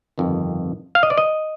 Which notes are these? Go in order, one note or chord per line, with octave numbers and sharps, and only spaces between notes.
G1 F2 D#3
F5
D#5
D5
D#5